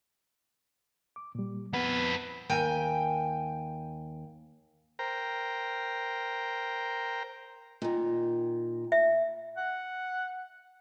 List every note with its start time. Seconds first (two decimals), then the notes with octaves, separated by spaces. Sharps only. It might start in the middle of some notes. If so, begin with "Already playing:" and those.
1.16 D6
1.35 A#2 G3
1.73 F2 B3 B4 F#5
2.49 D#2 G5 G#5
4.99 A#4 C5 G5 A#5
7.82 A#2 D#3
8.92 E5
9.57 F#5